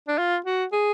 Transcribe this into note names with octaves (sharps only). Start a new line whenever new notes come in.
D4
F4
F#4
G#4